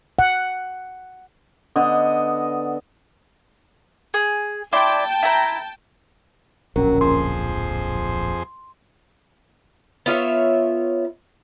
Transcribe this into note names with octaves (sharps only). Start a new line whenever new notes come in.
F#5
D3 B3 D#5
G#4
E4 D5 G5 A5 C6
E4 A#5
D1 A#1 F#3 C#4 A#4
F2 G#4 C5 C6
B3 F4 C#5 E5